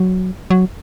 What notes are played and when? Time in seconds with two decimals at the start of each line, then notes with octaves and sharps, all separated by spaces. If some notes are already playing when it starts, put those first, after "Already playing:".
Already playing: F#3
0.50 F#3